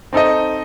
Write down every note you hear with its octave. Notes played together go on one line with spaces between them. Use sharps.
C4 D#4 A4 D#5